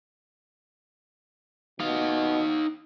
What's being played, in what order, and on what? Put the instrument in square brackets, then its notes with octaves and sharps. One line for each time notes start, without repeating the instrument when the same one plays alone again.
[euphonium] B2 [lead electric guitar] D#4 F5